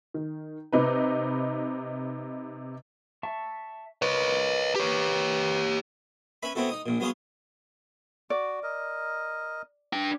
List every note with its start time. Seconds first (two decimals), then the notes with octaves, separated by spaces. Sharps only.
0.14 D#3
0.72 C3 D#4 B4
3.23 E5 A5 C#6
4.02 A#4 B4 C#5 D#5
4.76 G4 C#5
6.43 C#4 B4 E5 B5
6.55 B3 C4 E4 F#4 A4
6.69 D#4 D#6
6.86 A#1 A#2
7.00 F#3 B3 F#4 G#4 F5 C6
8.30 F#4 D5
8.63 A#4 D#5
9.93 D4 G5